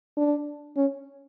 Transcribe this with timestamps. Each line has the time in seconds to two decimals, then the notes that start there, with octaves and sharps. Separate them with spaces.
0.17 D4
0.77 C#4